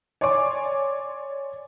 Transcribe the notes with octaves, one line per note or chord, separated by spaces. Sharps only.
C#5 D5 G#5 C6 D6